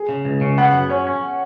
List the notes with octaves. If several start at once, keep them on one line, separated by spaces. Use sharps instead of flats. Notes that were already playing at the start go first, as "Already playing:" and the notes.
Already playing: G#4
C#3
C#2
C#3
B3 F#5
F#2
C#4 C#5
C#4